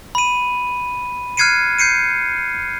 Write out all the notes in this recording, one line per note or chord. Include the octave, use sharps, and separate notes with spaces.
B5 D#7
F6 F#6 G#6 C7 C#7 D#7
G6 C7 C#7 D#7